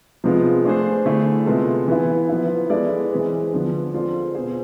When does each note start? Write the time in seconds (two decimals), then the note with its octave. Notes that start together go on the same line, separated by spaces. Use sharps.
0.24 C3 F3 G#3 B3 F4
0.65 A3 D4 G#4 C5
1.05 D3 A3 E4 G#4
1.46 C3 G#3 B3 F4 A4
1.88 E3 B3 E4
2.29 F3 B3 E4
2.70 G#3 B3 E4 A4 D5
3.12 E3 G#3 C4 G#4 B4
3.53 D3 F3 B3 D4
3.94 G#3 C4 F4 A4 D5
4.34 B2 B3 F4 G#4 C5